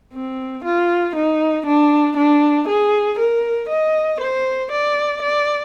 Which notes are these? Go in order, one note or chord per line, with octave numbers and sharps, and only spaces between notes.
C4
F4
D#4
D4
D4
G#4
A#4
D#5
C5
D5
D5